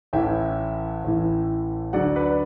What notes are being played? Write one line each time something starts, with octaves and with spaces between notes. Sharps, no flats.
A1 A2 E3 E5 G5
A1 A2 E3
D2 D3 F#3 D5 F#5
B4 D5